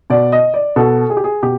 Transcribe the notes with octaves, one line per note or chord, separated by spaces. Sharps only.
B2 D5
D#5
D5
B2 A4
G#4
G4
G#4
B2 G4